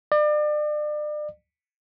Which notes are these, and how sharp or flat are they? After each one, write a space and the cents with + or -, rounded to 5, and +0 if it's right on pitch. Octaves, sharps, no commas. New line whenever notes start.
D5 +35